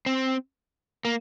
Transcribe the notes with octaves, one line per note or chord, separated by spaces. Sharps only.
C4
A#3